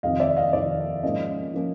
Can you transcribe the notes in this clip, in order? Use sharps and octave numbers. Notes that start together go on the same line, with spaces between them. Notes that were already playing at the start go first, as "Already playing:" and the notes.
F2 C3 D#3 D#5 F5
D5 E5
D#5 F5
F2 C3 D#3 D5
G#2 F3 A#3 C#4 D#5
F3 A#3 C#4